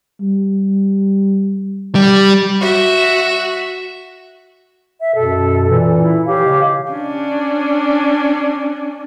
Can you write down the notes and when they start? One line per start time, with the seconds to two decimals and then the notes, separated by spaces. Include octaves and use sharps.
0.21 G3
1.95 G3
2.61 F#4 E5
5.01 E5
5.15 F#2 B2 A4
5.69 A#2 E3
6.00 E4
6.27 E3 G4 C#5 F5
6.45 C#3 G#3
6.92 C#4 D4